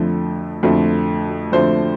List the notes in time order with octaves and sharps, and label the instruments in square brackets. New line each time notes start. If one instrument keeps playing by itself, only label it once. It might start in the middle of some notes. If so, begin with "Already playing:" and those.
Already playing: [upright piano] F2 D3 F3 A3
F2 D3 F3 A3
F2 D3 F3 A3 C5